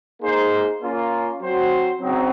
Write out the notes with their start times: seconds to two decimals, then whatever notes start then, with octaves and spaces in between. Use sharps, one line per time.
0.21 A#3 D#4 G#4 C5
0.80 A#3 C#4 F4
1.40 F#3 C4 F#4 C5
2.01 C#3 F#3 C4 D#4